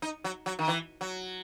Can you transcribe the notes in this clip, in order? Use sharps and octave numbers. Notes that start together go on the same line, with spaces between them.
D#4
F#3
F#3
D#3
E3
F#3